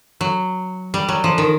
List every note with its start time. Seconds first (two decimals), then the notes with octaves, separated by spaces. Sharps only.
0.21 F#3
0.94 G3
1.09 F#3
1.24 F3
1.38 D#3